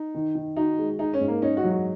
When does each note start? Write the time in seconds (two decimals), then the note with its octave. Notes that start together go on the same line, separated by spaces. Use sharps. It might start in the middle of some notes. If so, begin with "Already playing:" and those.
Already playing: D#4
0.15 D#3
0.35 D#3
0.57 D#4 F#4
0.79 G#3
0.99 D#4 G#4
1.14 C#4
1.20 G#2
1.28 A#3
1.42 C#4 D#4
1.57 F#4
1.64 F#3
1.71 F#4